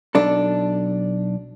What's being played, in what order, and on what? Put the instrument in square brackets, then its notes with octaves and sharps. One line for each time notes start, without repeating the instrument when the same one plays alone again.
[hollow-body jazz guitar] B1 D4 A4